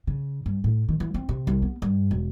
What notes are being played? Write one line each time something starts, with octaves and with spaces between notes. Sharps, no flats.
C#3
G2
A2
D#3
E3
C4
C3
C2
B3
G2
E1